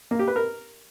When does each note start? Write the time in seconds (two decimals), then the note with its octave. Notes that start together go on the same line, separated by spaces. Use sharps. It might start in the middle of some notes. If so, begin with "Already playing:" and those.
0.11 A#3
0.19 G4
0.28 B4
0.36 A#4